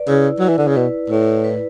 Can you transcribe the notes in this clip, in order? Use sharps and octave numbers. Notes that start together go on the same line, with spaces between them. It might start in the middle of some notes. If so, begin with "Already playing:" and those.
Already playing: B4 D5
C#3 E4
F#3 E4
E3
D3
C#3
B2 B4
A2 E4
B4